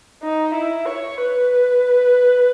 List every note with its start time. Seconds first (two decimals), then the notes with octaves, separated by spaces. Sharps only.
0.23 D#4
0.54 E4
0.86 C#5
1.17 B4